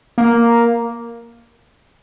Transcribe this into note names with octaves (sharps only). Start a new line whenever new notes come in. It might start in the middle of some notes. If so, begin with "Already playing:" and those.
A#3